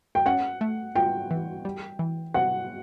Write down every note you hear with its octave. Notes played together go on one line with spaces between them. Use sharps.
G5
C#4 F#5
A3
F4 G5
E3
G3
E3
C3 F#5